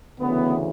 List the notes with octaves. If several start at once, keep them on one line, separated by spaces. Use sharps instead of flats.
D2 C#3 E3 B3